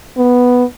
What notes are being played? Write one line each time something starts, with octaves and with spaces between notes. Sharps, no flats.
B3